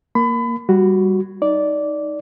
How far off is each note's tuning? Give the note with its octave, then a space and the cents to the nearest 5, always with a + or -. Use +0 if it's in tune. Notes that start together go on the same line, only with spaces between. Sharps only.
A#3 +0 B5 +30
G3 +0 F#4 +0
D#4 +0 D5 -10